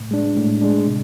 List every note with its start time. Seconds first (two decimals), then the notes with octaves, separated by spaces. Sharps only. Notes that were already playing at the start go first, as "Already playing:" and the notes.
Already playing: A2
0.11 G#3 D4
0.37 A2
0.62 G#3 D4
0.87 C3